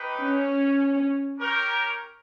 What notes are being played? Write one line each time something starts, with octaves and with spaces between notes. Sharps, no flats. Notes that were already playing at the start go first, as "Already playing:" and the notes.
Already playing: D#4 G4 B4 G5
C#4
C#4 G4 A#4 C#5 G5